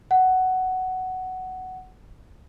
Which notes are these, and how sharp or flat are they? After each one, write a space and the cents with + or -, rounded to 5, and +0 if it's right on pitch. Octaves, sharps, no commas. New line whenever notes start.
F#5 +10